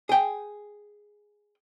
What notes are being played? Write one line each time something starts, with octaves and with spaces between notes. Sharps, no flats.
G#4 G5